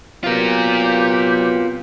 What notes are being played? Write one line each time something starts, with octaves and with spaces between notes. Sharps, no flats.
C3 F#3 B3 F4 G4 A#4